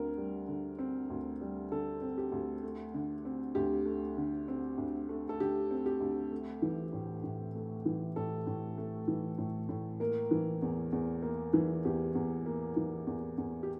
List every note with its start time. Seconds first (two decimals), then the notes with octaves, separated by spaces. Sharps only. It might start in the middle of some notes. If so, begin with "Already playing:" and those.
Already playing: D2 D3 C4 A#4
0.18 G3
0.48 D3
0.79 C4
1.10 D2
1.41 G3
1.71 D3 A4
2.02 C4
2.18 G4
2.32 D2
2.63 A3
2.94 D3
3.25 C4
3.55 D2 G4
3.86 A3
4.17 D3
4.48 C4
4.78 D2
5.09 A3
5.29 A4
5.40 D3 G4
5.71 C4
5.86 G4
6.00 D2
6.31 A3
6.62 E3
6.93 A2
7.24 A2
7.55 A3
7.85 E3
8.16 A2 A4
8.47 A2
8.78 A3
9.08 E3
9.38 A2
9.69 A2
10.00 A#3 A#4
10.31 E3
10.62 E2
10.92 E2
11.22 A#3
11.53 E3
11.85 E2 G4
12.15 E2
12.46 A#3
12.76 E3
13.07 E2
13.38 E2
13.63 G4